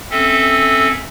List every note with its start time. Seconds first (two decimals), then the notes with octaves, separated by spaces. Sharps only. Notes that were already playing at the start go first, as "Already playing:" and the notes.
0.11 C4 C#4 A4 E5